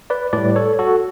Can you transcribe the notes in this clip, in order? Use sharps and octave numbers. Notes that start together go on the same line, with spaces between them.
B4 D5
A2 G3 B4 D5
A4 C#5
F#4 A4